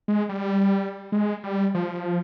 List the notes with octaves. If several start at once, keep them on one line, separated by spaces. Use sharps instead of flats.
G#3
G3
G#3
G3
F3